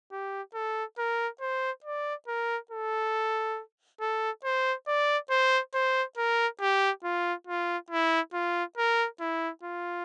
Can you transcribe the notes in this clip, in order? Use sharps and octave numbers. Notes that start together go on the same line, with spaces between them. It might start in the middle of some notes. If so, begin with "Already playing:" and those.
G4
A4
A#4
C5
D5
A#4
A4
A4
C5
D5
C5
C5
A#4
G4
F4
F4
E4
F4
A#4
E4
F4